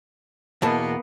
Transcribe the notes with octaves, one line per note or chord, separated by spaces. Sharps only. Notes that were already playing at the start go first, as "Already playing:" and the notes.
E2 B2 A#3 B3 A5